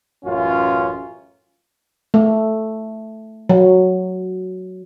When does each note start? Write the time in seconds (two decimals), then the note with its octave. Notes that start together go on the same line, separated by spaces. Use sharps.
0.25 A1 F#2 C#4 F4
2.14 A3
3.49 F#3